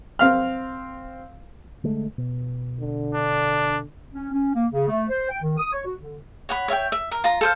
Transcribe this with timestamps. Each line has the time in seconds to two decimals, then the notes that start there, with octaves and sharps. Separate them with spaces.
0.19 C4 F5 F6
1.84 D3 G#3 A3
2.18 B2
2.80 D3
3.14 D4
4.14 C#4
4.32 C#4
4.54 A#3
4.72 C#3
4.88 A3
5.08 C5
5.29 G5
5.41 D#3
5.58 D#6
5.72 C#5
5.85 F#4
6.00 D3
6.49 C#5 F#5 B5
6.68 C#5 E5 F5 G5
6.92 E5
7.11 A#4
7.24 F4 A#5
7.41 A4 C5 F5